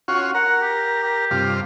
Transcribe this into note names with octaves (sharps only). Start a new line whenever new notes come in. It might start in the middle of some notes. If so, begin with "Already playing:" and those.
C#4 F4 F#4
A#4 F#5
G4
G4
G2 C3 F4